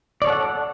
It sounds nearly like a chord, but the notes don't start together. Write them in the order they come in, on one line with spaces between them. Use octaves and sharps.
D5 C#5 A4 F#5